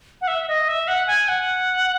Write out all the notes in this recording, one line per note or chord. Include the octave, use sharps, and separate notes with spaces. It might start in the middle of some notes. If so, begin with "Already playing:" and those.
F#5
E5
D#5
E5
F#5
G#5
F#5